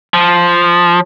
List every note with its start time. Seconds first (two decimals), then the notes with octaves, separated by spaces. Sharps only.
0.14 F3